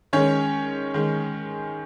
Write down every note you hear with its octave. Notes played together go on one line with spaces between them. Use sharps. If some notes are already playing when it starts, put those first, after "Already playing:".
D#3 G#3 C#4 C#5
D#3 G#3